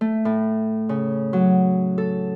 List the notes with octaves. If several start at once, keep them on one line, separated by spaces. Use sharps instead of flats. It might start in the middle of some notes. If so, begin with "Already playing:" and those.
A3
A2
C#3
F#3
A4